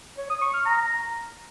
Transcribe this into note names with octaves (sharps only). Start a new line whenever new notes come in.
C#5
D#6
C#6
F6
A#5